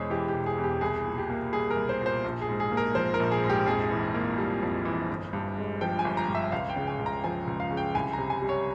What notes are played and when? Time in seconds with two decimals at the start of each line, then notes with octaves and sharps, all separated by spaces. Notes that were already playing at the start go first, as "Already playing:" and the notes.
Already playing: E1 E2 G#3 G#4 C5 C#5
0.10 E3 G4
0.28 G4
0.34 E1
0.46 G#4
0.58 E2
0.64 G4
0.81 C2 G#4
1.05 A#2
1.18 G4
1.30 A#3
1.52 G3 G#4
1.70 A#4
1.76 C2
1.89 C5
2.01 A#2 C5
2.24 A#1
2.42 G#4
2.49 G#2
2.60 G#4
2.72 A#3
2.77 A#4
2.95 F3 C5
3.14 A#4
3.20 A#1
3.31 G#4
3.44 G#2
3.50 G4
3.67 F2 G#4
3.91 E3
4.14 A#3
4.38 G3
4.63 F2
4.85 E3
5.10 G1
5.33 G2
5.58 G#3
5.81 F3 G5
5.99 G#5
6.05 G1
6.17 A#5
6.28 G2
6.35 E5
6.52 C#2 F5
6.69 G5
6.76 C#3
6.87 G#5
6.99 C#2
7.06 A#5
7.24 F3 G#5
7.47 C#2
7.60 F5
7.71 C#3
7.77 G5
7.95 C2 G#5
8.13 C3 A#5
8.30 G#5
8.42 G3
8.49 C#5